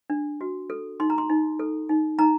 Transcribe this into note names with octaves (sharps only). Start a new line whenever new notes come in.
D4
F#4
A4
D#4 C6
A#5
C6
D#4
A4
D#4
D#4 A#5